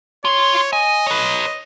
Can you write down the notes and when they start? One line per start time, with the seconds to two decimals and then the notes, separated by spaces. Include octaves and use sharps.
0.25 F4 C#5 C6
0.73 D#5 G#5
1.06 B4 C#5